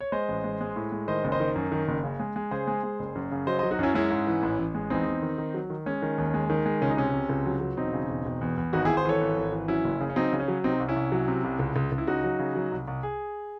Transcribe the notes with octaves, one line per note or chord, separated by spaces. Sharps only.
C#5
G#3 C5 D#5
A1
G#3
G#3
A2
G#3
D#3 C5 D#5
F#1
C5 D#5
D#3
F#2
D#3
F#1
C#3
G#3
G#3
C#3 G#4 C5
G#3
G#3
F#1
F#2
C#3
F#3 C5 D#5
C5 D#5
F#3
D#4 F#4
F#2 C#4 E4
G#3 C#4 E4
G#2
E3
A1
A1
G#3
E2 C4 D#4
E2
D#3
D#3
F#3
D#3
G#3 C#4
D#3
D#2
G#3
D#3
G#3
C#2 C#4
D#4
C3 C#4
C3
C#2
F#3
F#3
E1 C4 D#4
C#3
E1
E1
E2
E2
G#1 D#4 F#4
E4 G#4
G#1
G#4 C5
E3 A4 C#5
G#1
G#1
E3
F#3 C#4 E4
F#1
C#3
C#4
F#3 C4 D#4
C#3
C#4
F#3
C3 C4 D#4
C2
C#4 E4
C2
F#3
C3
C2
C#2
C#2
C#2
E4
C#3 D#4 F#4
F#3
C#3
F#3
C2
C2
G#4